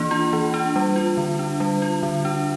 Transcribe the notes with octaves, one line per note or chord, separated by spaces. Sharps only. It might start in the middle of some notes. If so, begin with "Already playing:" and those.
Already playing: E3 A#3 D4 F4
F4
E3
D4
G3
F4
D3
D4
G3
F4
D3
D4